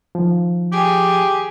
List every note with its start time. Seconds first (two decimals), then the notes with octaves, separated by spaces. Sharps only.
0.15 D#3 F3
0.72 G4 G#4